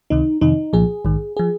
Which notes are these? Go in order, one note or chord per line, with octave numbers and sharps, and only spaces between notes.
C#2 C3 D#3 D#4
F2 C3 D#3 D#4
C2 A#2 F3 G#4
A#1 G#2 D#3
F3 G#4